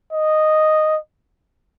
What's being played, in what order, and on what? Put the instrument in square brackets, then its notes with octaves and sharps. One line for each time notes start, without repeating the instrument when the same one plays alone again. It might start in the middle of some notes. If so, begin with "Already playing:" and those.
[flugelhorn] D#5